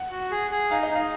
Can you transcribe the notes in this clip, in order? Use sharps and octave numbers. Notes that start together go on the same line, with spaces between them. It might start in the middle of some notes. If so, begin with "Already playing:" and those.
Already playing: F#5
F#4
G#4
G#4
D#4 F5
D#5
D#4 F5